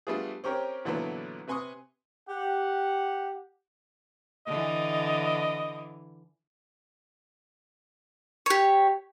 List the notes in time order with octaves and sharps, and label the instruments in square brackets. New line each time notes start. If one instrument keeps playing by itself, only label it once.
[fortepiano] G3 A3 B3 D4 F4 G#4
C4 C#4 G4 A#4 C5 C#5
A#2 D3 E3 F#3 A3 B3
C3 B4 G#5 C6 C#6 D#6
[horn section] G4 F#5
[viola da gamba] D3 E3 [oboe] D#5
[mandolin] G4 C#5